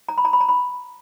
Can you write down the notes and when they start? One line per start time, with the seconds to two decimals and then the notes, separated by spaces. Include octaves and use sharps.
0.09 A#5
0.18 B5
0.25 A#5
0.33 B5
0.41 A#5
0.49 B5